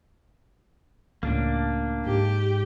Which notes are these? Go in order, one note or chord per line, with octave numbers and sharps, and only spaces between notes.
C#2 A2 A#3 D4
G#2 G4